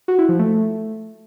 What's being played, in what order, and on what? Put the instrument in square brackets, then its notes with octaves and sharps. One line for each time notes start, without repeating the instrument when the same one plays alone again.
[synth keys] F#4
E4
F3
A3